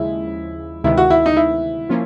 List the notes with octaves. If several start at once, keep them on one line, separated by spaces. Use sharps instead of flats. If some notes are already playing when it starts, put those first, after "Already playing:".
Already playing: D#2 C#3 F3 G#3 E4
D2 C3 D#3 G#3 B3 E4
F#4
E4
D#4
E4
F3 A#3 C#4 F4